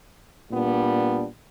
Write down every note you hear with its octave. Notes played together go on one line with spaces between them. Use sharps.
A#2 G3 B3 D4